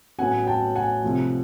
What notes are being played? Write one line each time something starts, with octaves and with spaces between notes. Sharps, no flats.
A1 A2 F#3 B3 F#5 G#5
G5 A5
F#5 G#5
C2 C3 F3 A3